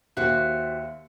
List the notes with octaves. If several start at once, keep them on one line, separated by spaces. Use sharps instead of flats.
D#2 F#4 G4 C5 E5 C#7